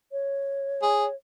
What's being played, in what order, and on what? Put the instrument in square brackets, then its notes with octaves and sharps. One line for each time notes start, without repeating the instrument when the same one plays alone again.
[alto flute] C#5
[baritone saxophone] G#4